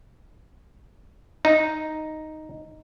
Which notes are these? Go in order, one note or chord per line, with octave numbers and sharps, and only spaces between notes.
D#4